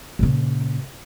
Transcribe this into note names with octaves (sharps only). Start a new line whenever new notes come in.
A#2 C#3